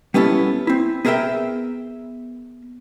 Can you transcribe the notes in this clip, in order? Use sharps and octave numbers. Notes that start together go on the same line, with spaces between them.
G3 B3 C#4 E4 A4
C4 E4
B3 G#4 A#4 C5 E5 G5